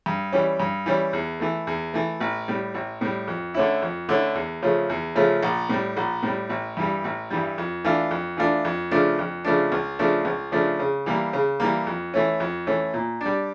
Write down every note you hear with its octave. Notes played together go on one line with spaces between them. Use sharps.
G2
E3 G3 C#4
G2
E3 G3 C#4
E2
E3 A3
E2
E3 A3
A1
A2 G3
A1
A2 G3
F2
D3 A3 C#4 E4
F2
D3 A3 C#4 E4
E2
C#3 F3 A3 C#4
E2
C#3 F3 A3 C#4
A#1
A2 G3
A#1
A2 G3
A1
G2 E3 G3
A1
G2 E3 G3
F2
E3 A3 D4 F4
F2
E3 A3 D4 F4
F2
C#3 F3 A3 D4
F2
C#3 F3 A3 D4
C#2
C#3 F3 A3 D4
C#2
C#3 F3 A3 D4
C#3
E3 G3 A#3
C#3
E3 G3 A#3
F2
E3 A3 C#4
F2
E3 A3 C#4
A#2
G3 D4